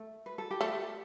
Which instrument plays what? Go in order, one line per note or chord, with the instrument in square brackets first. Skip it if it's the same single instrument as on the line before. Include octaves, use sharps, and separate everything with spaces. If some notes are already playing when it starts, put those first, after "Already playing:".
Already playing: [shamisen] A3
[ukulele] B4
A4
G4
[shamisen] A3 [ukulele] A4